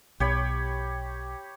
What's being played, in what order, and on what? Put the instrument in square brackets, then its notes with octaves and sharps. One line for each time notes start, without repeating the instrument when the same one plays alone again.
[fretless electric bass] B1 [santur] G4 C#5 B5